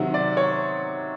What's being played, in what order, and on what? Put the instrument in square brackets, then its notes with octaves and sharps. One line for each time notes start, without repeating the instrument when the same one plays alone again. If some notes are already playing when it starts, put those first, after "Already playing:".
Already playing: [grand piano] C3 D#3 F#3
D5
C#5